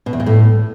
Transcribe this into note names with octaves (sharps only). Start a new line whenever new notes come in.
B2
E2
A#2
A2